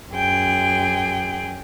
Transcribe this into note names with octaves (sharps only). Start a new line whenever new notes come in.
F#2 G#4 G5